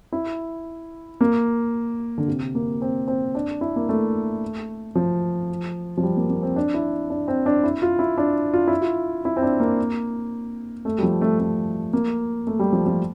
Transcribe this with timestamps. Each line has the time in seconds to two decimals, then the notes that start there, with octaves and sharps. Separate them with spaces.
0.13 E4
1.21 A#3
2.18 D3
2.28 C3
2.55 A#3
2.82 C4
3.08 C4
3.35 D4
3.61 E4
3.76 A#3
3.89 A3
4.95 F3
5.97 F3
6.03 G3
6.17 A#3
6.30 A#3
6.42 C4
6.56 D4
6.74 E4
7.10 D4
7.28 C4
7.46 D4
7.64 E4
7.82 F4
7.99 E4
8.17 D4
8.54 F4
8.68 E4
8.81 F4
9.25 E4
9.37 C4
9.42 D4
9.60 A#3
10.85 A3
10.98 G3
11.03 F3
11.21 A3
11.40 A3
11.93 A#3
12.47 A3
12.59 G3
12.73 F3
12.86 F3